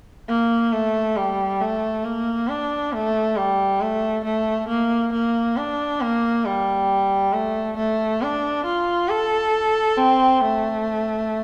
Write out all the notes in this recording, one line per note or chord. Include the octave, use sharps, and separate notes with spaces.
A#3
A3
G3
A3
A#3
D4
A3
G3
A3
A3
A#3
A#3
D4
A#3
G3
A3
A3
D4
F4
A4
C4
A3